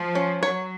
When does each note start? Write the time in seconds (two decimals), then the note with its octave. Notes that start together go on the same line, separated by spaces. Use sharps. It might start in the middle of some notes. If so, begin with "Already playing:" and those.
Already playing: F3
0.15 C#4
0.42 F#3 C#5